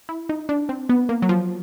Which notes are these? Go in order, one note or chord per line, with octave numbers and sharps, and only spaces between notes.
E4
D#4
D4
C4
B3
A#3
F#3
F3